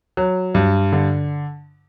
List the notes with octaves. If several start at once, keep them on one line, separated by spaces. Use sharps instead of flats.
F#3
G2
D3